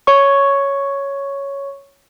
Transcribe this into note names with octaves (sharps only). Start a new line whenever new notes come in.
C#5 C#6